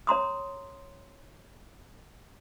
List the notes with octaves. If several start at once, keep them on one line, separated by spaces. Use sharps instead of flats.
C#5 A#5 C6 D#6